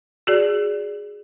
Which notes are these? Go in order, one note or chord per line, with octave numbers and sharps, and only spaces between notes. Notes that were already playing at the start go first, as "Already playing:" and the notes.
F#4 G#4 D5